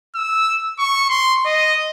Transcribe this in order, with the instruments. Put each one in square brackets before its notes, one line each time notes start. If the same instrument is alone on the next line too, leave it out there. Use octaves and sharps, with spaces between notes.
[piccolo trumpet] E6
C#6
C6
D#5